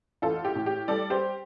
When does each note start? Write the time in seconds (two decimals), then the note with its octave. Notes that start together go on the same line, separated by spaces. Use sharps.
0.22 A1 F4 A4
0.45 G4
0.55 A2
0.66 G4
0.88 G3 A4 D5
1.10 G4 C5